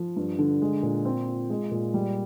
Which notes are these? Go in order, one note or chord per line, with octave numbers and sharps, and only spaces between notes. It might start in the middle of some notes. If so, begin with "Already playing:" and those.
Already playing: F3
G2
D3
G#3
A#2
C4
F4
G#3
A#2
G3